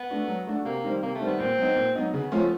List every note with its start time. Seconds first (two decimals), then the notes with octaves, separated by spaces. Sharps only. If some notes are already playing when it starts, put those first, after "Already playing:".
Already playing: B3
0.10 A3 D4 F#4
0.28 F#3
0.47 A3 D4 F#4
0.65 C3 A#3
0.84 D#3 G3 C4
1.02 C3 A#3
1.15 A3
1.20 D#3 G3 C4
1.27 B3
1.39 A#2 C4
1.58 F#3 B3 D#4
1.76 A#2
1.95 F#3 B3 D#4
2.13 C#3 B3
2.32 F3 A3 C#4 F4